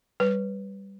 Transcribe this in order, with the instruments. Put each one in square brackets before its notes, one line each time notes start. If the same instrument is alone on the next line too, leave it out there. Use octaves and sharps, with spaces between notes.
[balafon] G3 B4